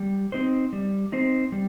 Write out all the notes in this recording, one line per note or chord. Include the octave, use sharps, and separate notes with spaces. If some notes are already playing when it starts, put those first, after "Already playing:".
Already playing: G3
C4 D#4 C5
G3
C4 D#4 C5
G3